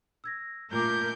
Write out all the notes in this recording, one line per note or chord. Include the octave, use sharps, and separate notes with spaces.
E6 G#6 A#6
A#2 A3 F4 A#4 D6 G6